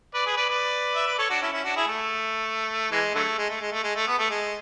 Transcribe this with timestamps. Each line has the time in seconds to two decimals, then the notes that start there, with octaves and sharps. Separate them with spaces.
0.14 B4 D5
0.26 G#4 B4
0.37 B4 D5
0.49 B4 D5
0.96 E5
1.07 B4 D5
1.18 A4 C#5
1.30 D4 F#4
1.42 C#4 E4
1.53 C#4 E4
1.64 D4 F#4
1.76 E4 G#4
1.88 A3
2.92 E3 G#3
3.15 D3 F#3 A3
3.38 G#3
3.50 A3
3.61 G#3
3.73 A3
3.84 G#3
3.96 A3
4.08 B3
4.19 A3
4.30 G#3